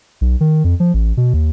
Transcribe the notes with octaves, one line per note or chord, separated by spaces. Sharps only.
B1
D#3
F2
F3
A1
B2
D#2